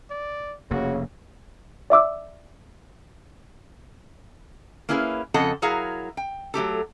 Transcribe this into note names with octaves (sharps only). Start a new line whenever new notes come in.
D5
F1 C#3 A#3 F#4
D5 E5 D6 E6
A#3 C#4 E4 G#4 B4
F2 C#3 A4 D#5 F#5 A5
F#3 E4 G#4 A#4 F5 F#5
G5
F#3 A3 G4 A4